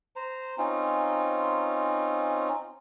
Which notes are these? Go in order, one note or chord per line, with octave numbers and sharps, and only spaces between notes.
C5 A#5
C4 C#4 D#4 F4